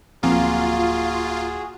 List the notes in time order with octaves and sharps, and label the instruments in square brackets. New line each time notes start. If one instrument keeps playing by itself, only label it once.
[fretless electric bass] D1 F3 C4 [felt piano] A#3 [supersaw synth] F4 [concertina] F#4 G#4